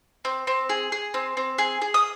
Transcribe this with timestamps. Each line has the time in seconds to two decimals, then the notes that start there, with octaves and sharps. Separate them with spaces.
0.25 C4
0.47 C4
0.70 G#4
0.92 G#4
1.14 C4
1.37 C4
1.58 G#4
1.82 G#4
1.94 D#6